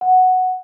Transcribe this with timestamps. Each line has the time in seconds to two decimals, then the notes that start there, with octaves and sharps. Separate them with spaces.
0.01 F#5